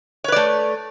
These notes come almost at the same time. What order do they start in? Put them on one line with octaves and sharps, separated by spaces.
C#5 B4 D5 A3